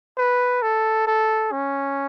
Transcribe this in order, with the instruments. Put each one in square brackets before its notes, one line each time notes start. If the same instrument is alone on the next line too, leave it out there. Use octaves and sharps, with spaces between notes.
[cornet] B4
A4
A4
C#4